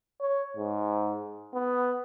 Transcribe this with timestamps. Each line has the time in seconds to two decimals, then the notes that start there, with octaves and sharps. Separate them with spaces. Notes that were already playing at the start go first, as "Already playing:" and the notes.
0.21 C#5
0.57 G#2
1.54 B3